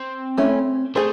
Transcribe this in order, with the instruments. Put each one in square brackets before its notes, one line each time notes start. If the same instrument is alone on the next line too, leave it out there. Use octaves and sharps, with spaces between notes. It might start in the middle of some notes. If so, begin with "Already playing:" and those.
Already playing: [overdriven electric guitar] C4
[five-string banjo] A3 C#4 E4
[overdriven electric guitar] A3 [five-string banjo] G#4 C5